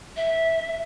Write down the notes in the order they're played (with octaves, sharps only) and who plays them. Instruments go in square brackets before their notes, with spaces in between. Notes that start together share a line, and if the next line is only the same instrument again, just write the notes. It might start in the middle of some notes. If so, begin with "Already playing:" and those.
[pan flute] E5